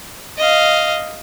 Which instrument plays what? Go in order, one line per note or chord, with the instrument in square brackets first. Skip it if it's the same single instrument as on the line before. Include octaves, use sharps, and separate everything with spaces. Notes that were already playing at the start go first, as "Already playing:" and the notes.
[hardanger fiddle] D#5 F5